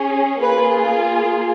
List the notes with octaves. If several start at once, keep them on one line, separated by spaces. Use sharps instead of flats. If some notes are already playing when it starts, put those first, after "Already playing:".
Already playing: C#4 G#4
A#3 F4 G#4 B4